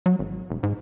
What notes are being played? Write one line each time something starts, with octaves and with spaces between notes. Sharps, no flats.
F#3
G#1
E1
G#2